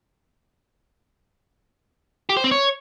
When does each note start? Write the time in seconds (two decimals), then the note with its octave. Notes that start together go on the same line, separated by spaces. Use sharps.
2.29 G4
2.37 C5
2.44 C4
2.51 C#5